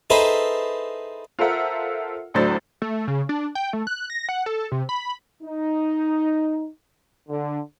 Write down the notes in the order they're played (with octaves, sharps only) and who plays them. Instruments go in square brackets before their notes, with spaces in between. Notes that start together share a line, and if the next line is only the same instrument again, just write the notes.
[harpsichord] D#4 E4 G#4 A4 B4 C5
[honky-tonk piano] F4 A4 A#4 C5 E5 F#5
D2 A2 F#3 D4 C5 A6
[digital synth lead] A3
C#3
D4
G5
A3
F#6
A#6
F#5
A4
C3
B5
[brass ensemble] D#4
D3